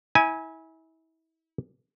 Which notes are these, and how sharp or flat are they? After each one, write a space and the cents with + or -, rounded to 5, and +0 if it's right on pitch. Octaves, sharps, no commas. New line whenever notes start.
E4 -35 G#5 +0